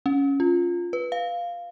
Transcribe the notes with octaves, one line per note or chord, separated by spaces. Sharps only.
C#4
F4
B4
F5